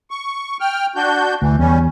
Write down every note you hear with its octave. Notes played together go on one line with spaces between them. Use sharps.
C#6
G5 F6
D4 F#4 G6
D2 E3
E2 G3 C#4